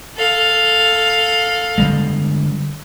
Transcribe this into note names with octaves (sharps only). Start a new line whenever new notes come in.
A4 F5
D3 G3 G#3